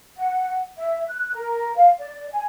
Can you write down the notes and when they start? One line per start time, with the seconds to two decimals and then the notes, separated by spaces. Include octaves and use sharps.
0.17 F#5
0.77 E5
1.09 F#6
1.34 A#4
1.76 F5
1.99 D5
2.31 G#5